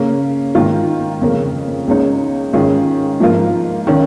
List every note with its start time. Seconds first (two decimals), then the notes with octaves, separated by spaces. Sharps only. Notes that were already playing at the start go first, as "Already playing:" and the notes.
Already playing: C#3 A#3 C#4
0.55 G#2 D#3 A#3 F4
1.22 F2 C#3 A#3 C#4 A#4
1.87 C#2 C#3 A#3 D#4 C#5
2.53 G#2 D#3 C#4 F4 G#4
3.20 G#2 F3 A#3 F4 A#4
3.87 D#3 C#4